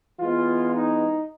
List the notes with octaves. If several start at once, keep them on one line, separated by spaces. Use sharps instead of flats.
E3 G#3 B3 F4
D#4